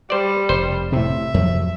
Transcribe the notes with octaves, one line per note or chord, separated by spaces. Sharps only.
G3 C5 D5
F1 C5
A2 C3 E5
F2 F3 F#3